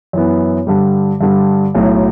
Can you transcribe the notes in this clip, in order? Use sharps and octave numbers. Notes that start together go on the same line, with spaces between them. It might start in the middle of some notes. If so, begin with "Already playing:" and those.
F#2 E3 B3
G2 D3 G3
G2 D3 G3
B1 A2 F#3